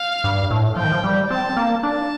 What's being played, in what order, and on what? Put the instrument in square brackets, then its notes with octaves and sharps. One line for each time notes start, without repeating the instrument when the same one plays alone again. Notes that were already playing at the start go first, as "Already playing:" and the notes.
Already playing: [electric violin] F5
[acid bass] G2
A2
[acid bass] F3 [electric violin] G5
[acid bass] D#3
F3
G3
[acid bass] C4 [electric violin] A5
[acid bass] A#3
[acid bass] D4 [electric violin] A5